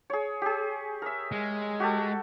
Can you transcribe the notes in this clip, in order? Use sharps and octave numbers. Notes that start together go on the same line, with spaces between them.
G#4 C#5
G4 G#4
A#4 E5
G#3
F#4 G4 A4